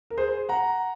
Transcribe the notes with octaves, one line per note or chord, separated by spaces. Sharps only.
A#4
G#4 C5
F#5 A#5